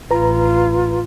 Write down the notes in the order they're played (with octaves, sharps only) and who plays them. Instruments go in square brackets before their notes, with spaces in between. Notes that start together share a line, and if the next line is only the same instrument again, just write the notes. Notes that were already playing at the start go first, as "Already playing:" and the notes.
[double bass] A1 [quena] F4 [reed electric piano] B4 A#5